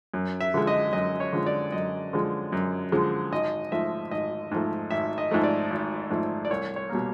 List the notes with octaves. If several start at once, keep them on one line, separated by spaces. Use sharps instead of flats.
F#2
E5
D3 F3 G#3
D#5
F#2 D#5
C#5
D3 F3 G#3
D5
F#2 D#5
D3 F3 G#3
F#2
D3 F3 G#3
G#1 D#5
G#2 F3 A3 E5
G#1 D#5
G#2 F3 A3
G#1 E5
D#5
G#2 F3 A3
D5
G#1
G#2 F3 A3
D5
C2 C#5
C#5
B2 G3 A#3